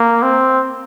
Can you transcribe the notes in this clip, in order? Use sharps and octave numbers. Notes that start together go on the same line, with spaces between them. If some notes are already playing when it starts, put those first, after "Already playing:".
Already playing: A#3
C4